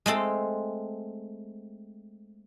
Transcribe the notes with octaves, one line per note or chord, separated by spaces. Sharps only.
G#3 A3 C4 A4